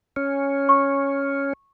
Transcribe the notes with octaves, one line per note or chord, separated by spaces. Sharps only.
C#4
C#6